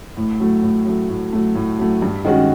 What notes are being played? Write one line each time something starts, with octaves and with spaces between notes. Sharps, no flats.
A2
F#3 A3
A2
F#3 A3
A2
F#3 A3
A2
F#3 A3
G2
D#3 G#3 C#4 F#4